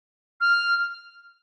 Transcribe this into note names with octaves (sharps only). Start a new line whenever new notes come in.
F6